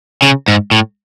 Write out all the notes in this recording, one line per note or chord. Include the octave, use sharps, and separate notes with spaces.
C#3
G#2
A2